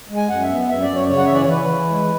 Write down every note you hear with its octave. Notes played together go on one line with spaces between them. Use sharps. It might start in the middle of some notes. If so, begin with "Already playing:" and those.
G#3
G#5
F#2 F#5
E5
B3
F#2 E5
D5
F#2
C#5
C#3 C#5
F#5
E5
E3
D5
C#5
E3 B4
E3
G#3